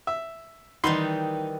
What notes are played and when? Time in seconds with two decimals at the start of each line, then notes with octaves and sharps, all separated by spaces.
0.07 E5
0.84 D#3 E3 G3 D#4 B5 C6